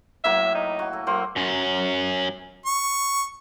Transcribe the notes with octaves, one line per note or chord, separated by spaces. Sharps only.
A2 F#3 A#3 E5
D#4
F#4
A4
F#3 A#3 C5
F#2 C#4
C#6